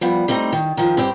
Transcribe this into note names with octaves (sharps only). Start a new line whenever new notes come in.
F3 G3 B3
G3 A3 C4 D#4
D#3
D#3 F3
G2 C4 G4 G5